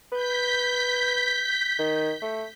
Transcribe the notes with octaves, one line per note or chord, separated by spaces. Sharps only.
B4 G6 B6
D#3
A3